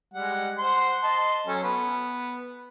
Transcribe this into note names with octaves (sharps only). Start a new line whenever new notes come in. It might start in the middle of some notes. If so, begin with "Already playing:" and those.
G3 G#3 F#5
C5 F#5 C6
D#5 A5 C6
F#3 C#4 A4
B3